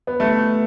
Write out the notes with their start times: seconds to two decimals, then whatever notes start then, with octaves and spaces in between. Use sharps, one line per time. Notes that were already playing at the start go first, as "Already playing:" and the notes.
0.07 B3
0.20 A3